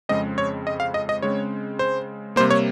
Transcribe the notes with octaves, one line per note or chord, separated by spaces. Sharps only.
F2 C#3 G#3 C4 D#5
C#5
D#5
F5
D#5
D#5
C#3 G#3 C4 C#5
C5
C3 G3 A#3 C5
C#5